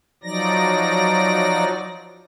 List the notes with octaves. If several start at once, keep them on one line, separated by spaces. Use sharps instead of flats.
F3 F#3 D#4 D5 A#6